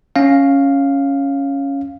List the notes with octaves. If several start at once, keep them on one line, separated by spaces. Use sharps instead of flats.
C#4 F5